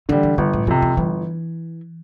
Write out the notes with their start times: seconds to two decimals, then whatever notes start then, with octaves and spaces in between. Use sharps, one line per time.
0.09 D3 E3 G3
0.23 E3
0.38 G1 D3
0.53 A2
0.67 F2 C3 E3
0.82 E3
0.97 G1 E3